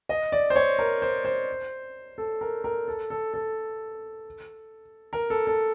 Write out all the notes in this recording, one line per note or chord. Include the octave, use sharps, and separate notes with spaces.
D#5
D5
C5
C#5
A#4
C5
C5
A4
A#4
A#4
A4
A4
A4
A#4
A4
A4